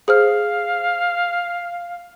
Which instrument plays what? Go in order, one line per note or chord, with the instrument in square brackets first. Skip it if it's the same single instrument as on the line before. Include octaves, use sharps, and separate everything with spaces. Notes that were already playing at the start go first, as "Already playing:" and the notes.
[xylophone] G#4 C5 F6 [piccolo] F5